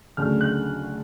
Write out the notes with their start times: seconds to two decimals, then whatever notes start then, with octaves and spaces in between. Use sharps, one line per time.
0.17 D2 C#3 F#3 A3 D4 F6
0.41 F#6